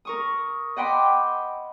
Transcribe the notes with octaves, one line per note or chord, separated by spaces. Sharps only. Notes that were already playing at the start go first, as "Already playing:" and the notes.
A#4 C#6 D#6
D#5 F#5 G5 B5 C6 D6